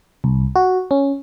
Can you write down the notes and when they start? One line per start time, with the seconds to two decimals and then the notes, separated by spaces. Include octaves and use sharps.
0.24 C2
0.56 F#4
0.91 C#4